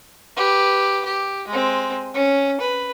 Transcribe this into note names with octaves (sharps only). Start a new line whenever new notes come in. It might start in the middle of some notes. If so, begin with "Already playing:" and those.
G4 B4
G4
G#3 C4
C#4
B4